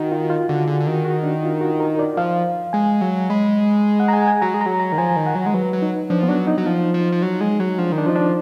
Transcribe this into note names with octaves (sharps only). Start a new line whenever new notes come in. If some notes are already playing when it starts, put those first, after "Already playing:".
Already playing: D#3 F#4
F4
F4
D3 F#4
D3 G#4
D3
D#3 F#4
F#4
D4
F4
F#4
A#4
D5
F3 F5
G#3 G#5
F#3
G#3 B5
F#5
A#5
G#5
G#5
F#3 A#5
G#3
F#3 A#5
A#5
D#3
F3 G#5
D#3
F#5
F#3
G#3
F#3 B4
F#3
D#4
F3 D4
B3
F#3 D4
D#4
F#3
F3
F3
F3
F#3
G#3
F#3
F3 D4
D#3
D4
F3 D#4
D4